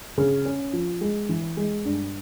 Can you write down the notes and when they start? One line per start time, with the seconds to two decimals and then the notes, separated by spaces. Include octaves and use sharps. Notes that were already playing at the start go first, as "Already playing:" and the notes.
0.18 C#3
0.45 C#4
0.73 F3
1.01 G#3
1.29 E3
1.57 G#3
1.85 G2